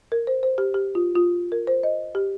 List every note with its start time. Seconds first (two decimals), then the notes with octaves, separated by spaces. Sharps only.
0.12 A#4
0.27 C5
0.43 C5
0.58 G4
0.74 G4
0.95 F4
1.15 F4
1.52 A#4
1.67 C5
1.83 D#5
2.15 G4